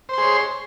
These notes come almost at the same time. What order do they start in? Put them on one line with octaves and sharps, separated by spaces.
C5 C6 G#4 C#5